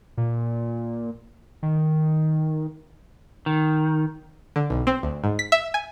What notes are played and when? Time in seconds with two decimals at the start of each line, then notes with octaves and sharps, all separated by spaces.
0.17 A#2
1.63 D#3
3.46 D#3
4.56 D3
4.70 B1
4.87 C4
5.03 D2
5.24 G#2
5.39 B6
5.52 E5
5.74 G#5